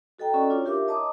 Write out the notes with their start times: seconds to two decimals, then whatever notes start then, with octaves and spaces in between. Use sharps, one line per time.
0.19 F#4 A4 D#5 G5 A#5
0.34 C#4 E4 F#4 A4 D5
0.50 D4 F4 C#5
0.65 E4 G4 A#4 E5 F5 D6
0.87 C#5 D#5 A5 A#5 D6 D#6